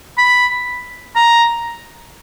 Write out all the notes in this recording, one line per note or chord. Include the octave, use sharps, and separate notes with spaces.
B5
A#5